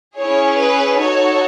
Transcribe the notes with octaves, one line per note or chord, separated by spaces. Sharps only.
C#4 E4 G#4 C#5
B4
D#4 F#4 A4 C#5